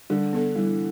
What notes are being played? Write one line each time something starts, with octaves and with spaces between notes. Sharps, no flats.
D3 G3
B3 D4 A4
E3 G3